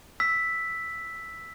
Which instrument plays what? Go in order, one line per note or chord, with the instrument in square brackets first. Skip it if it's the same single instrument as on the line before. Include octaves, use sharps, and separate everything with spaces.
[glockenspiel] E6 B6